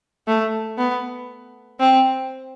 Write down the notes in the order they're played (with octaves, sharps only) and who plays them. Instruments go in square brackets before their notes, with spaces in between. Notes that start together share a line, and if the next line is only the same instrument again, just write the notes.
[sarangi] A3
B3
C4